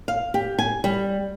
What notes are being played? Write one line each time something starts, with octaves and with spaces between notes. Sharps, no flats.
F5
G4
G#5
G3